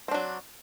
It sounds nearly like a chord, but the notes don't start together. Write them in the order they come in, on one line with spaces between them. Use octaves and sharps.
C4 D4 F#3